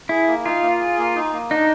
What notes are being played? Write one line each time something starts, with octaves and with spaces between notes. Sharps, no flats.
E4 G#4
A#3
D#4 F4
A#3
G#4
A#3
D#4
A#3
D4 D#4